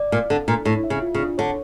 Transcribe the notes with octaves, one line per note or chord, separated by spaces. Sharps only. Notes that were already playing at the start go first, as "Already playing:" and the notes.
Already playing: D5
A#2 F5
D3 A4
A#2 D4
A2 C#5
E5
C#3
F4
C#3
D4
D3 C#5